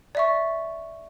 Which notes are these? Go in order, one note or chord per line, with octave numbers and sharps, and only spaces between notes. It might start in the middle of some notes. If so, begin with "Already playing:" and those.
D5 E5 C#6